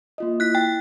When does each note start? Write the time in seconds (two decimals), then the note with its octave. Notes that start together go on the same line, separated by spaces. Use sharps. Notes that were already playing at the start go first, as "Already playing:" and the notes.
0.18 A#3 F4 D#5
0.40 E4 F#6 B6
0.55 G5 A6